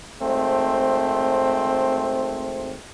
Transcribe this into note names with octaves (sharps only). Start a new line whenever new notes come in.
G#1 A3 C4 C5